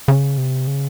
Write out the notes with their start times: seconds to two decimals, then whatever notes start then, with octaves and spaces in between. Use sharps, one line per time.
0.08 C#3
0.38 C3
0.67 C#3